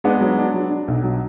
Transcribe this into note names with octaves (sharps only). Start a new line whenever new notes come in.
G#3 B3 D4
F#3
D4
F#3
D4
B1
F#3